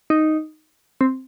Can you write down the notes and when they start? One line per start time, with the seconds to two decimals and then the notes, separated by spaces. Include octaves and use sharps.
0.10 D#4
1.01 C4